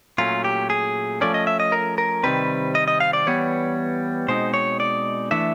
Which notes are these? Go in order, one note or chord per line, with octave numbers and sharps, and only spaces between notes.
A#2 F#3 A3 C#4 F4
G4
G#4
F3 A3 C#4 D5
D#5
E5
D#5
A#4
A#4
C3 D#3 G3 C4 B4
D#5
D#5
F5
D5
E3 G3 B3 C#5
B2 G#3 C4 D#4 C5
C#5
D5
E3 A3 D4 E5